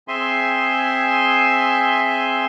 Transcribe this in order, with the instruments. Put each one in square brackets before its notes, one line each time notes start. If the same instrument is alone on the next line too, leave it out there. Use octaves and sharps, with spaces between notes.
[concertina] C4 G#4 E5 G#5 C6